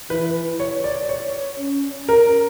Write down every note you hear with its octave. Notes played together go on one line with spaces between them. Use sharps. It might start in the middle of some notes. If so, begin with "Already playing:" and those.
E3 B4
C#5
D5
C#5
C#4
A#4